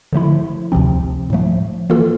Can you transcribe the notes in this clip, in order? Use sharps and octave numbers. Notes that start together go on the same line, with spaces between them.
D3 F3 A3 E4
D2 C3 F3 C4
A2 F3 A3
E3 A#3 F4 A4